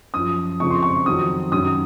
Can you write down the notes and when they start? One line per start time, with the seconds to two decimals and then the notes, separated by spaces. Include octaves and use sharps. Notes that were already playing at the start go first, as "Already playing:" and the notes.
0.14 F#2 F3 D#6
0.60 F2 C#3 F3 C#6
0.70 C6
0.83 C#6
1.06 F2 D#3 F#3 D#6
1.52 F#2 D#3 F#3 D#6